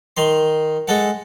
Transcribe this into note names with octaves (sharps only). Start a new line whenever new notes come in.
D#3 C6
G#3 A4 F#5